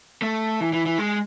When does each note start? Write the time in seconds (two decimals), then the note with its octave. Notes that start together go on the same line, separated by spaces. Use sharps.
0.22 A3
0.61 E3
0.73 E3
0.86 E3
0.98 G#3